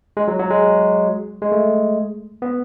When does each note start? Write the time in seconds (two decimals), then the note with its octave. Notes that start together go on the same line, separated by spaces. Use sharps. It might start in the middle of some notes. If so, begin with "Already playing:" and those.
0.17 G#3
0.28 F#3
0.40 F#3
0.50 G#3
1.42 G#3
1.52 A3
2.42 B3